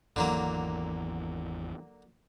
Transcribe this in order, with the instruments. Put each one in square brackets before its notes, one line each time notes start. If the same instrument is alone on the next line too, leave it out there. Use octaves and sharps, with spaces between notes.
[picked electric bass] G#1 E2 E3 [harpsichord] D3 F#3 A#3